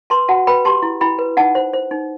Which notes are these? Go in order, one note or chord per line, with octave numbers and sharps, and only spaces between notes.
B4 A5 C6
F#4 F#5 A5
B4 G5 B5
G4 A5 C6
E4
E4 G5 B5
B4
D#4 F#5 A5
C5
C5
D#4